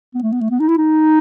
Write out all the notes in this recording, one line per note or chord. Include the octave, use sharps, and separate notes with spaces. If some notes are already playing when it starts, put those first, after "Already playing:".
B3
A3
B3
A3
B3
D#4
E4
D#4